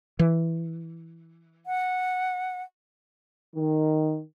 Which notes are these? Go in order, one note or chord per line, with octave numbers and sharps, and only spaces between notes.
E3
F#5
D#3